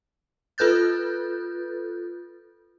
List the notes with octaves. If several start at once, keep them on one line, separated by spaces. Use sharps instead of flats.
F4 A4 B4 F#6 G6 A6